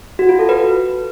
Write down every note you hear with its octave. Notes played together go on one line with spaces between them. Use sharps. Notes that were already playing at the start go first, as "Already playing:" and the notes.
F#4
F4
A4
B4